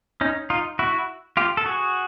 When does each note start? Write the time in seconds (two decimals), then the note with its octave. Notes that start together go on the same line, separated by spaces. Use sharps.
0.21 C#4 D#4
0.50 D#4 F4
0.79 E4 F#4
1.37 F4 G4
1.57 A4
1.66 F#4 G#4